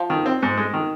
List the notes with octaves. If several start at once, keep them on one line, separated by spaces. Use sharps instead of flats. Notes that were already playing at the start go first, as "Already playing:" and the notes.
Already playing: F3
D#3
C4
G#2
G#3
D#3